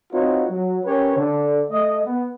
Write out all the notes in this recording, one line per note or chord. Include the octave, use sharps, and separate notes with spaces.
C4 D#4 F4 F#4 B4 C#5
F#3
C#4 G4 A#4 B4 C#5
D3
A3 D#5
B3